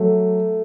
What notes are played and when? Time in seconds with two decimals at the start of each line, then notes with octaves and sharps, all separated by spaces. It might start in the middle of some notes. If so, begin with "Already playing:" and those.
Already playing: F#3 A3